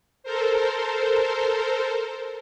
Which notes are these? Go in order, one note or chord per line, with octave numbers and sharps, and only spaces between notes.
A4 A#4 C5